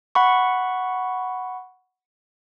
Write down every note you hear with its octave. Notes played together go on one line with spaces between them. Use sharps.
F#5 B5 C#6